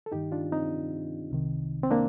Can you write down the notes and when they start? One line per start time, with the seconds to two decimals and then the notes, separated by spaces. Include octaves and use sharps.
0.06 A4
0.12 G2 D#3 D#4 G4
0.32 D4 F4
0.52 C4 D#4
1.31 C2 C3 D#3
1.83 C4
1.91 A#3 D4